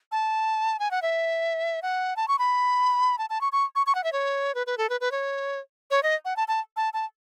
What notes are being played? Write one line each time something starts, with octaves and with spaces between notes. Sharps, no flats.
A5
G#5
F#5
E5
F#5
A5
C#6
B5
A5
A5
C#6
C#6
C#6
C#6
F#5
E5
C#5
B4
B4
A4
B4
B4
C#5
C#5
D#5
F#5
A5
A5
A5
A5